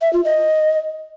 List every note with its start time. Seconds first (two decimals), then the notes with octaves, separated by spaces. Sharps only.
0.01 E5
0.13 F4
0.25 D#5